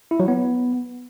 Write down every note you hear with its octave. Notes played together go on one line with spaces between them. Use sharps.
E4
F#3
B3